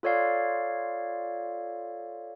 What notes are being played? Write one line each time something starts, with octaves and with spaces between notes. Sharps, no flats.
F4 A4 C#5 D5 F5